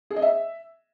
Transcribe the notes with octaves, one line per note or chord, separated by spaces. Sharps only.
G#4
D#5
E5